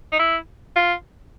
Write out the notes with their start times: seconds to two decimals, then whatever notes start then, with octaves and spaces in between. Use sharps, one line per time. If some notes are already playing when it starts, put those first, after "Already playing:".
0.12 D#4
0.19 E4
0.76 F4